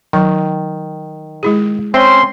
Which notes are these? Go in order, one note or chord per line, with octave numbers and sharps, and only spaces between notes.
D#3 F#3 C#6
G#3 E4 G#4
C4 C#4 E5 C6